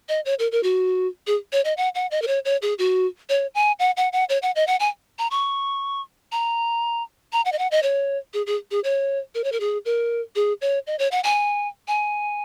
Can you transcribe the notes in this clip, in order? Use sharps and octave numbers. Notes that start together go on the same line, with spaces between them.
D#5
C#5
A#4
A#4
F#4
G#4
C#5
D#5
F#5
F#5
D#5
A#4
C#5
C#5
G#4
F#4
C#5
G#5
F#5
F#5
F#5
C#5
F#5
D#5
F#5
G#5
A#5
C#6
A#5
A#5
F#5
D#5
F#5
D#5
C#5
G#4
G#4
G#4
C#5
A#4
C#5
A#4
G#4
A#4
G#4
C#5
D#5
C#5
F#5
G#5
G#5